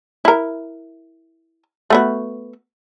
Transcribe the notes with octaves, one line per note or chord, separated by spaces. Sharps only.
E4 A#4
A3 B3 F#4